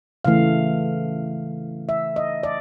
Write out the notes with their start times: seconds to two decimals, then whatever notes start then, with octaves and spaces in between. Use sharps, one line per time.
0.25 C#3 E3 A3 F5
1.89 E5
2.16 D#5
2.43 D5